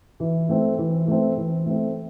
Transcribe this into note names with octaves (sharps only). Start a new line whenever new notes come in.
E3
A3 C4
E3
A3 C4
E3
A3 C4